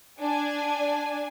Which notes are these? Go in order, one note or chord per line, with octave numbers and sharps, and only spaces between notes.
D4 G#5